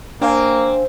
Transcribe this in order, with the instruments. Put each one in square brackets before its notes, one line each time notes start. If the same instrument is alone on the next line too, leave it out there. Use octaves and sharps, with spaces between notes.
[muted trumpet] A#3 [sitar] C4 [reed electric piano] D4 F5 G#5